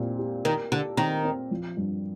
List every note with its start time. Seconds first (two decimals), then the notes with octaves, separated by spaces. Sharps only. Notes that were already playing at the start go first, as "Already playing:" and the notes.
Already playing: A#2 C4 G4
0.19 G4
0.45 D#3 A#4
0.72 D3 G4
0.97 D#3 C4
1.25 C4
1.51 F3
1.77 G2